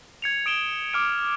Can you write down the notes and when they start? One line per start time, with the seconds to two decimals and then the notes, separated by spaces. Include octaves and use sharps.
0.22 G#6 C#7 F7
0.46 D#6 D7 E7 G7
0.93 D6 F6 D7